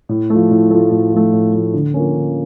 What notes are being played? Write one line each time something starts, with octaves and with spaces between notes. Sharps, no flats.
A2
F3 A3
A2
F3 A3
A2
F3 A3
A2
F3 A3
D3
F3 A#3 C#4
D3